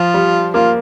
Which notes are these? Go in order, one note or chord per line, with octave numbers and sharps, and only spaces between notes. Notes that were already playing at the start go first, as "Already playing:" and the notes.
Already playing: F3 F4
G3
A#3 F4